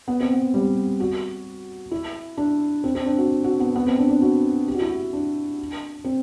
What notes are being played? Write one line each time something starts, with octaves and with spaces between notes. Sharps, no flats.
B3
C4
B3
G3
F#4
E4
D4
C4
C4
D4
F#4
F#4
B3
B3
C4
D4
D4
F#4
G4
F#4
E4
F#4
D4
C4